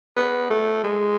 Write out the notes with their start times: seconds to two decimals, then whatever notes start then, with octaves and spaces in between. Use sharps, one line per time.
0.17 B3
0.50 A3
0.84 G#3